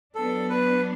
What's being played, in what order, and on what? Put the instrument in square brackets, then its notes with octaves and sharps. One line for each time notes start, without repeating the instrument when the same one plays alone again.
[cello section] F#3 B3 D4 [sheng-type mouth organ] A4
[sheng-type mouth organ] B4